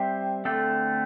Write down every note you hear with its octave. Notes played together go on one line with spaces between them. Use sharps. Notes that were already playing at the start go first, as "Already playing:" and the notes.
Already playing: G3 C4 G4 C5 E5
D3 A3 C4 A4